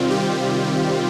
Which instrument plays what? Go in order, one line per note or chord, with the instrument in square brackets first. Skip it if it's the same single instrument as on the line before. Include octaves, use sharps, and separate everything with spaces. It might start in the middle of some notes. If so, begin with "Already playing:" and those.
Already playing: [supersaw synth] C3 D#3 G3 C4 F4
G4